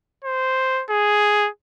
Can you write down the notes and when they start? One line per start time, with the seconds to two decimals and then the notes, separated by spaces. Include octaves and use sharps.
0.24 C5
0.90 G#4